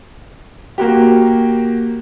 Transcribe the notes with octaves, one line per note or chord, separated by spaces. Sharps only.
A#3 F#4 G4